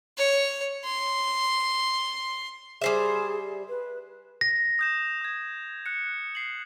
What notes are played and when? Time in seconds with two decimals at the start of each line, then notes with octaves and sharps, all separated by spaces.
0.18 C#5
0.85 C6
2.82 G3 G#4 C5 E5
3.69 B4
4.41 A#6
4.79 D#6 G6 E7
5.21 D#6 G#6
5.86 F#6 C#7
6.35 C7 F#7